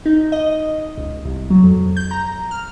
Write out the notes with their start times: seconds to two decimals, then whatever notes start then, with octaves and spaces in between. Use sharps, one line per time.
0.06 D#4
0.32 D#5
0.98 C#2
1.25 C2
1.50 F#3
1.64 F2
1.97 G6
2.11 A#5
2.51 F6